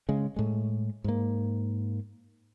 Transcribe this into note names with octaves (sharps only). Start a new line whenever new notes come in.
C#3 G#3
A2 G#3
G#2 A#3